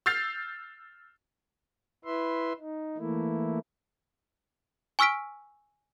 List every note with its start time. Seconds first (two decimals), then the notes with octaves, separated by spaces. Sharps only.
0.06 E6 F6 G6 A6 C7 F7
2.05 E4 B4 E5 C6
2.60 D#4
2.98 E3 A3 A#3 E4
4.99 G#5 C#6 E6 F6 B6 D7